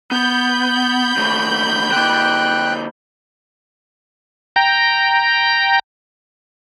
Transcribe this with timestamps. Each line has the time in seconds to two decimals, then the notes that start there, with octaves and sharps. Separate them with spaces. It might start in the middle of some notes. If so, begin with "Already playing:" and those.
0.11 B3 B5 G6
1.17 D#2 A3
1.92 D3 A#3 G5 F#6
4.56 G5 A#5